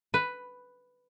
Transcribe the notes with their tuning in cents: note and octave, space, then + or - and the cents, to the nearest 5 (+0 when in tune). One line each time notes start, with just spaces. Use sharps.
B4 +5